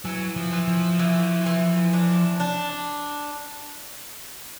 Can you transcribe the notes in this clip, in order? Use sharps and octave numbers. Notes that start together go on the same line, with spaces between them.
E3 F#3
F3
E3
F3
E3
E3
D4
D4